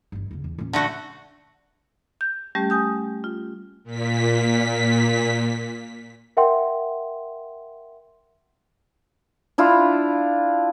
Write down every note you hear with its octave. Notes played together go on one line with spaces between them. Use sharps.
G1 D#3
E2 C#3
E2
A#2 C#4
D3 A3 F#4
G6
G3 A3 C#4 G4
G#5 D#6 G6
F4
A#2 B6
A#4 E5 F#5 G5 C6
D4 E4 F4